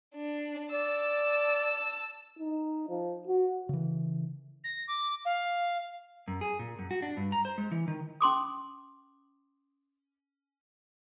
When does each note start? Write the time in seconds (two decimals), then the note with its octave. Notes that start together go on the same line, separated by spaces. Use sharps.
0.15 D4
0.72 D5 A5 E6
2.39 D#4
2.89 F3
3.27 F#4
3.69 C#3 E3
4.64 A#6
4.88 D6
5.25 F5
6.28 F#2
6.41 G#4
6.59 A#2
6.79 F#2
6.91 F#4
7.02 D4
7.17 G2
7.32 A#5
7.45 C5
7.58 G#3
7.71 E3
7.88 D#3
8.21 C#4 C6 D6 D#6